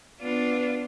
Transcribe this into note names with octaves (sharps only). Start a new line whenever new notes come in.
B3 D4 F4 B4